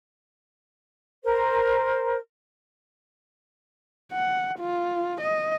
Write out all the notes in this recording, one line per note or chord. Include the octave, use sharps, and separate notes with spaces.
A#4 C5
F#5
F4
D#5